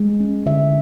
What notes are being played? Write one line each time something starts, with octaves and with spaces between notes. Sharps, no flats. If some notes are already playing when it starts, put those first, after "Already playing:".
Already playing: G#3
C#4
D3 E5